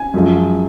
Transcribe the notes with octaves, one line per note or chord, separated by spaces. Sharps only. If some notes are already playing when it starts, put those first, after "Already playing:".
Already playing: G#5
F#2 F3 G#3